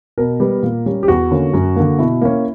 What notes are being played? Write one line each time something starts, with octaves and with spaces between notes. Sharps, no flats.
B2 A#4
G3 B3
A#2
G3 C#4
G4
E2 F#4
D3 A#3 C#4
F#2
D3 A#3
B2 E4
A#3 C#4